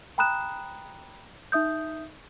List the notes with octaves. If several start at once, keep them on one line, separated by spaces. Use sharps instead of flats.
G5 A#5 B5 D#6 F#6 E7
D#4 E5 D#6 G6